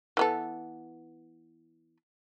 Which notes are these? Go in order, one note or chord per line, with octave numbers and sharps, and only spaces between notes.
E3 B3 A4